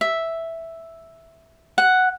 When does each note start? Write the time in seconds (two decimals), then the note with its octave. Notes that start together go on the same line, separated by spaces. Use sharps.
0.01 E5
1.78 F#5